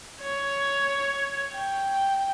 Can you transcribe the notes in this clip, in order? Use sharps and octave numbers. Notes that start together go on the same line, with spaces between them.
C#5
G5